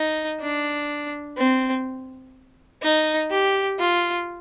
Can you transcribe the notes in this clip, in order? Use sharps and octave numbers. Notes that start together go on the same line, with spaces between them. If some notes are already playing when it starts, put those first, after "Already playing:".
Already playing: D#4
D4
C4
D#4
G4
F4